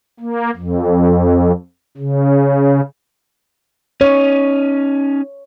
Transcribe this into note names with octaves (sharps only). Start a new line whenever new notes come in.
A#3
F2
C#3
C#4 D#4 C#5